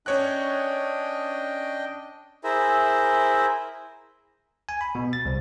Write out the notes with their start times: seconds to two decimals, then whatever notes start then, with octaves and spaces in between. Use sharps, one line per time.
0.06 C#4 D4 C#5 D#5 G5 F#6
2.44 E4 G#4 A#4 C5 E5
4.69 G#5
4.81 B5
4.95 B2
5.13 A6
5.25 C2